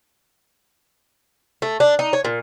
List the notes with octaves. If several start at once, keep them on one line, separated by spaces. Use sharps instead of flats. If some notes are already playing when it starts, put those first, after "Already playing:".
A3
D4
D#4
C#5
A#2